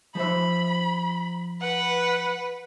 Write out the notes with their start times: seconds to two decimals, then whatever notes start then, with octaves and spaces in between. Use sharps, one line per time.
0.15 F3 C5 E5 B5
1.61 B4 F#5